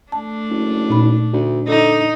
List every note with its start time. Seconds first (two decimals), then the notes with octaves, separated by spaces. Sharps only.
0.12 A3 D4 A5
0.50 F#1
0.90 A#2 D#4 B5
1.33 D2
1.68 D3 D#4 A4